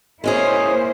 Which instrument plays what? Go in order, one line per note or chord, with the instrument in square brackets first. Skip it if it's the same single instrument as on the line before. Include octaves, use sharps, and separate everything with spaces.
[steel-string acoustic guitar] G#3 C#4 G#4 [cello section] A#3 E4 C5